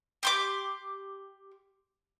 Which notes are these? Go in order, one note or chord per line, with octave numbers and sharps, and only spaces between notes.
G4 C6 D6